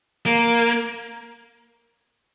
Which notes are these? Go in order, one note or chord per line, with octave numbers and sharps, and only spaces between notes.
A#3